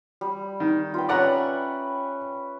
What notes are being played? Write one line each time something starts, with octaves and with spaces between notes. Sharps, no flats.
G3
D#3
F4 B4 G5
C#4 B4 D5 E5 F#5 A#5